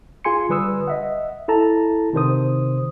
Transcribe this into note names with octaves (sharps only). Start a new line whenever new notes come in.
F4 G#4 G#5 C6 C#7
D3 G3 B4 D#6 E6
D#5 E5 F#5
E4 A4 A5 A#5
C3 D#3 C5 D#6